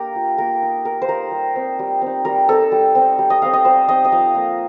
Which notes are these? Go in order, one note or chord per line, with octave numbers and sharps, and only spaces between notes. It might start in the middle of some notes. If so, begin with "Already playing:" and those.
Already playing: A#3 D4 G4 A#4
F4
A#3 A#4
D#4
A#3 A#4
C5
D#4 A#4
G3
C4 D#4
G3
C4 D#4
G3 A#4
C4 D#4 A4
G3
C4 D#4
G3
D#5
C4 D#4 F5
D#5
G3 C5
C4 D#4 D#5
D#5
F3 F5
A#3 F4